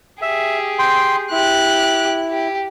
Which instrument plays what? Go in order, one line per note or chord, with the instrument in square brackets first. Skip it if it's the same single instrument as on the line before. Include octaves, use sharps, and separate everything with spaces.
[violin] G4 G#4 [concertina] E5
[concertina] G5 C6
[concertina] E4 [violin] G4 F#6
[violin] G4